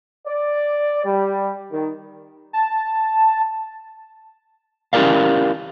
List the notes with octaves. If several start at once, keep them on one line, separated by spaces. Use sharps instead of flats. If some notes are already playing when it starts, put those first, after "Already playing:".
D5
G3
D#3
A5
C#4 E4 G4 A#4 D5 F5